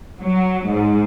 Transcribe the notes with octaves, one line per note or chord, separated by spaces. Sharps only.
F#3
G#2